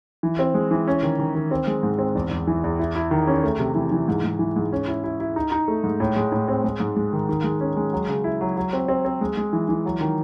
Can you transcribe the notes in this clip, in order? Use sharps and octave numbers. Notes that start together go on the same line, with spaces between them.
E3
C4
G#3
E3
C#4
D#3
D#3
D#3
C4
G#3
G#2
C4
E2
E2
E3
E2
E4
E4
D#3
C#4
A3
C3
E3
E3
G#2
G#2
E3
G#2
C#4
E4
E4
E4
D#4
D#4
A3
G#2
A2
G#3
A2
C4
G#3
G#2
G#3
D#3
D#3
G#3
C#4
G#3
F#3
C#3
E4
F#3
F#3
C4
C4
C4
G#3
G#3
E3
E3
F#3
D#3